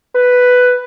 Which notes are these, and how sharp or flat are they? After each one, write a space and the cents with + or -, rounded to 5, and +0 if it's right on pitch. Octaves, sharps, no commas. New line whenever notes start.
B4 +5